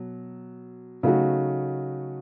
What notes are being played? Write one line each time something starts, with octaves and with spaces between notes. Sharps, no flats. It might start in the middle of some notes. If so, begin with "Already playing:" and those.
Already playing: B2 F#3
C#3 F#3 A3 D#4 F#4